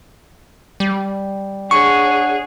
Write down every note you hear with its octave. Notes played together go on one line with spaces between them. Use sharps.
G3
D4 G#4 C#5 F#5 C#6